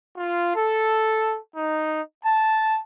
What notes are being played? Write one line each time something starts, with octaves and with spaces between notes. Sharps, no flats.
F4
A4
D#4
A5